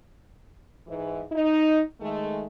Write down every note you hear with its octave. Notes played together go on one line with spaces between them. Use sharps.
G#2 E3
D#4
D#3 G#3 A3